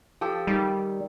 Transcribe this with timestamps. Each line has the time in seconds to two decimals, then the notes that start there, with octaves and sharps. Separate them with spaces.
0.21 F3 G4 A4
0.47 D#3 G3